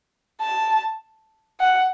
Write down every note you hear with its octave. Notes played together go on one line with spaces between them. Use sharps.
A5
F#5